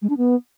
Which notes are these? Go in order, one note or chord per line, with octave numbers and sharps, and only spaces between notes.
G#3
D4
B3